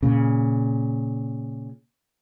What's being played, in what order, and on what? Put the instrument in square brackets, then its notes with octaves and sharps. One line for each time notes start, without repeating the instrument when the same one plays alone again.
[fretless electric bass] A#2 C#3